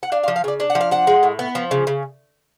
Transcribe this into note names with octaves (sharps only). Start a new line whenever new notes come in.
F#5
D4 F5
F5
F3
F5
C#3 D5
D4
F#5
F3
F5
D4 F#5
G#3
A2
B3
F3
C#3
C#3